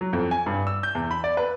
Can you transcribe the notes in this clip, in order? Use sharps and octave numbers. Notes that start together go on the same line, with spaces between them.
F#3
F2
G#5
G2
E6
G6
E2
B5
D5
B4